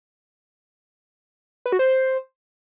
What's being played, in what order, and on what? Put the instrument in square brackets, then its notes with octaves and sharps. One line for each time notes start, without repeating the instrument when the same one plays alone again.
[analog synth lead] B4
F#4
C5